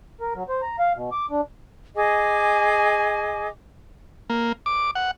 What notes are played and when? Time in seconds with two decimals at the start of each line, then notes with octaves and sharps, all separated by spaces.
0.21 A#4
0.35 F#3
0.49 C5
0.62 A#5
0.79 F5
0.95 B2
1.12 D6
1.30 D4
1.96 G#4 D#5 G#5 D6
4.30 A#3
4.66 D6
4.95 F#5